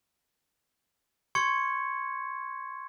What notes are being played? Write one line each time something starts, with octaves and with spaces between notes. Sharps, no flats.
C6 C#6 G#6 C#7